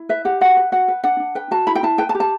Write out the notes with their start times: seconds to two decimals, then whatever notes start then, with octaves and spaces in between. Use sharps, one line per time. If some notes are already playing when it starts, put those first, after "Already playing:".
Already playing: E4
0.09 B4 E5
0.25 G4 F#5
0.41 F#4 F#5
0.57 B4
0.72 F#4 F#5
0.88 B4
1.04 D4 F#5
1.20 D4
1.35 B4 G5
1.51 F#4 A5
1.67 E4 B5
1.75 G5
1.83 E4 A5
1.98 B4 G5
2.09 A5
2.15 G4
2.20 A5